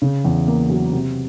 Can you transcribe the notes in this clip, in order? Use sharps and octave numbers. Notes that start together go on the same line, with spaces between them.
C#3
E2
A#3
F#3
C3